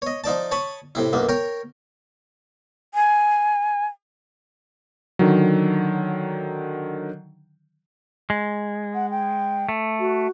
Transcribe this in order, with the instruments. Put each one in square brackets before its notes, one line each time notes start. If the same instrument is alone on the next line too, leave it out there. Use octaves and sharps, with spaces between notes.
[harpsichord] C#5 D#5
F3 D#4 D5 A5
C#5 A5 B5 C#6 D#6
A2 C3 E4
B1 F#2 A#3
A#4 C#5 G5 A#5
[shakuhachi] G#5
[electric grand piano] D3 D#3 F#3
[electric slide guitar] G#3
[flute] F#5
G5
[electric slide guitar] A3
[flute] F#4